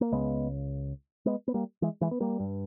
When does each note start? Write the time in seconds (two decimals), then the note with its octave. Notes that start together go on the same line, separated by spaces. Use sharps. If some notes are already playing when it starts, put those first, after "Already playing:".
0.01 A#3
0.12 C#2 C#3 G#3 B3
1.26 G#3 B3
1.48 B3
1.54 G3 A#3
1.82 E3 G#3
2.01 E3 G#3
2.11 B3
2.20 G3 A#3
2.40 G2